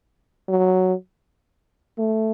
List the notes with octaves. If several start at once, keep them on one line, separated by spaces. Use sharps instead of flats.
F#3
A3